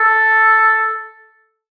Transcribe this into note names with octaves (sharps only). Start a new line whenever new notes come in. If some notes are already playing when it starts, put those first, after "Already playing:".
Already playing: A4